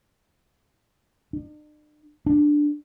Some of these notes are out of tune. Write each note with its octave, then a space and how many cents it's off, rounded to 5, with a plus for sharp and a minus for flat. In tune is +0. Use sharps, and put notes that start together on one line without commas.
D4 +45
D4 +5